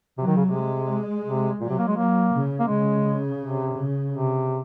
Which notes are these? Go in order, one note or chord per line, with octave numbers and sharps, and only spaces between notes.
C3 F#3
D#3
C#3
C3
G#3
C3
A#2 F#3
C3
A#3
G#3
F#3 A#3
C#3
A#3
C#3 G#3
C3
C#3
C3